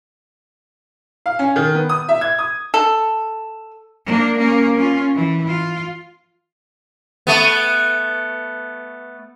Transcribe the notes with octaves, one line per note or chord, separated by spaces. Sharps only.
F5
C#4
D#3
B3
D#6
E5
G#6
D#6
A4
A#3 D4
A#3 C#4
C#4 F4
E3
F4
A3 B3